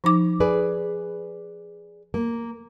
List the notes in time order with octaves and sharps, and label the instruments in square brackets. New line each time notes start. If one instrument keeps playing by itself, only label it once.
[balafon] F3 D#4 D6
[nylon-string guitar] G#4 B4 D5
A#3